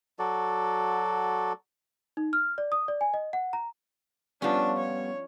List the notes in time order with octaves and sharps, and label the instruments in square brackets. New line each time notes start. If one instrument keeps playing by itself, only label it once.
[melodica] F#3 F#4 A4 D5
[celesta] D#4
F6
D5
D#6
D5
G#5
D#5
F#5
A#5
[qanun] F3 C#4 [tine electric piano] G3 B3 [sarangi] D4
[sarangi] C#5